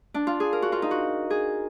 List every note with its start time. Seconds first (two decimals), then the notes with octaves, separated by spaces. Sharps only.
0.14 D4
0.27 F4
0.40 G#4
0.53 A#4
0.62 F#4
0.72 F4
0.82 D#4
0.91 F#4
1.30 G#4